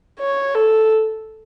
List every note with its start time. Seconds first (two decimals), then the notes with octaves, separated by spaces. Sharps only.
0.20 C#5
0.55 A4